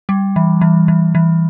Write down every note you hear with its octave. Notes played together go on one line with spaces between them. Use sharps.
G3
E3
E3
E3
E3